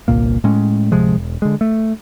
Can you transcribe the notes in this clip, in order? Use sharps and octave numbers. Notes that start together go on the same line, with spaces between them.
G1 C2 A#2 A#3
A2 G#3 C#4
D1 C3 F3 G#3
E1
D3 G#3
A3